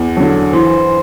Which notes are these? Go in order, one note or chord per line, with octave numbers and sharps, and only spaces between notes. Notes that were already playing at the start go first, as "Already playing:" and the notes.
Already playing: E2
D3 F#3
E3 C5